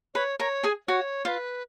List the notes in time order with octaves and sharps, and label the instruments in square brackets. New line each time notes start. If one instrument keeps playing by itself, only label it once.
[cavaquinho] B4 B5 [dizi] C#5
[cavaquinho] A#4 A#5 [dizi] C#5
[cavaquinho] G#4 G#5
[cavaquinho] F#4 F#5 [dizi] C#5
[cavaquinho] F4 F5 [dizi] B4 C#5